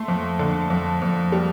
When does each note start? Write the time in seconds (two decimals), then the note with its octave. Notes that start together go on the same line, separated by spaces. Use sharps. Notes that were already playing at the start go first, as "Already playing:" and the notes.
Already playing: A3 C6
0.08 F2
0.39 D3
0.70 F2
1.02 F2
1.32 G3